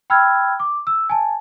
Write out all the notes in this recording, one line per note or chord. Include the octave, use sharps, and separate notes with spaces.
G5 B5 E6 F6 G#6
D6
E6
G#5 A5